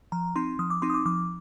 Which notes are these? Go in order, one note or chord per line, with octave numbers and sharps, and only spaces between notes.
F3 A#5
C4 D#4 C6
F3 D#6
D6
C4 D#4 C6
D#6
D6
F3 D6